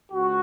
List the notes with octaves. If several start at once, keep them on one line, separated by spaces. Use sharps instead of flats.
C#2 F#4